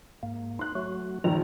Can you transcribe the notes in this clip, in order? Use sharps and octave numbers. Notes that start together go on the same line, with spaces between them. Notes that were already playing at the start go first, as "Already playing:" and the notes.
G#2 A#3
D#4 C6 F#6
F#3 A3 F#4
A#1 F#2 D#3 A#5